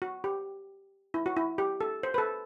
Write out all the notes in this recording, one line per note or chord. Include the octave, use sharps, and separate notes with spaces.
F#4
G4
E4
F#4
E4
G4
A4
C5
B4
A4